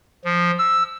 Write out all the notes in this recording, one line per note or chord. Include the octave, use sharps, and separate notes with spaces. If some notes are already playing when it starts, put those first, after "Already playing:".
F3
E6